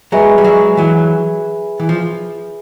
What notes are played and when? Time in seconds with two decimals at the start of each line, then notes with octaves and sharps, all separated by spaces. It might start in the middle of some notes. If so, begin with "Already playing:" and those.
0.12 F#3 G#3 G#4 B4 E5 G#5 B5
0.38 G3
0.45 F#3 G#3
0.77 E3 F#3
1.80 E3
1.89 F3